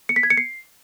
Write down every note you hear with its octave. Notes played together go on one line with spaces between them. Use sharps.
C#7
B6
G#6
C#7
C7